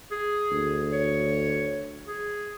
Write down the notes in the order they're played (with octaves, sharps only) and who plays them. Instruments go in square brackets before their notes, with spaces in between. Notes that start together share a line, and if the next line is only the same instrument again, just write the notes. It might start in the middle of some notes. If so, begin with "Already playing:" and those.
[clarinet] G#4
[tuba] D2
[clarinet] C#5
G#4